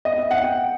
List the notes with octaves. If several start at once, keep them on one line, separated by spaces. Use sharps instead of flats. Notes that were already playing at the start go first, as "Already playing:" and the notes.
D#5
E5
F#5
G5